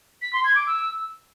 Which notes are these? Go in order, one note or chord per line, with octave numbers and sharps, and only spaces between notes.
B6
C6
G#6
D6
E6